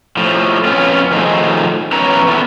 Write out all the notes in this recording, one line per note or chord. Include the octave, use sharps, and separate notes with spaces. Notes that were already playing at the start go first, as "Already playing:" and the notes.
A2 F3
F2 B3 C#4 F4
D#3 F3 A3 D#4 G#4 C5
E2 C#4 B4 C#5 A#5
E3 A3 B3